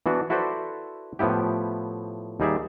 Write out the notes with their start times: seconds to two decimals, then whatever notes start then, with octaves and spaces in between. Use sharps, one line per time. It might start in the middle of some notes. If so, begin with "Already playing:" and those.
0.06 E3 B3 D4 F#4
0.30 E4 F#4 A4 B4 C5 D5
1.19 A2 F3 B3 E4 G4
2.40 D#2 G3 D#4 G#4 D5 E5